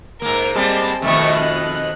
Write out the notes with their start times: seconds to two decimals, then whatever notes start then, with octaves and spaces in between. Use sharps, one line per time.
0.22 G#2 A#3 A#4
0.55 G3 G#3 A#3 C4 A5
1.02 F2 B2 D#3 A3 C#6
1.37 F#6